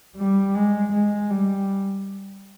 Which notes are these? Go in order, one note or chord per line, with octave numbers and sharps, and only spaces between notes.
G3
G#3
G#3
G3